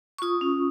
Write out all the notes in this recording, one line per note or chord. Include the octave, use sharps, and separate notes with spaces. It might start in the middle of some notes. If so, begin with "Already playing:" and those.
C#6
F4 D#6
C#4